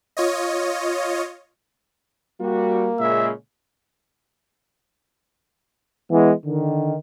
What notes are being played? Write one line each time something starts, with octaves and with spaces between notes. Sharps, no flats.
F4 C#5 D#5
G3 A#3 F#4
A#2 C#3 G#3 E5
E3 G#3 B3
D3 D#3